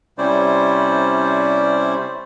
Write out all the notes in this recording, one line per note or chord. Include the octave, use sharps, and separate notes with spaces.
C3 G3 C#4 E4 C5 D5